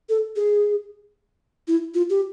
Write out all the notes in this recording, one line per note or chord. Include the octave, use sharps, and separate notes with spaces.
A4
G#4
E4
F4
G4